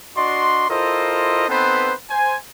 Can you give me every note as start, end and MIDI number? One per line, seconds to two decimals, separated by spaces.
0.17 0.67 62
0.17 0.67 66
0.17 0.67 74
0.17 0.67 75
0.17 0.67 84
0.69 1.48 64
0.69 1.48 65
0.69 1.48 69
0.69 1.48 70
0.69 1.48 72
0.69 1.48 75
1.49 1.92 59
1.49 1.92 60
1.49 1.92 63
1.49 1.92 69
1.49 1.92 71
1.49 1.92 72
2.10 2.35 72
2.10 2.35 80